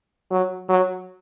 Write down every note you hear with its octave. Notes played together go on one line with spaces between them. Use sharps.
F#3
F#3